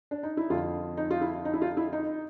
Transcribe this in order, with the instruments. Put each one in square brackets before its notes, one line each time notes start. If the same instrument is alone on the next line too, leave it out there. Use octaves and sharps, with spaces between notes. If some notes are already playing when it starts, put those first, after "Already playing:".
[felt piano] D4
D#4
E4
F2 F4
D3
D#4
F4
E4
D#4
E4
F4
E4
D#4